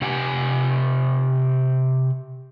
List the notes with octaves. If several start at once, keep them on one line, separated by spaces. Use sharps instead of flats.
C3 G4 F#5 G#5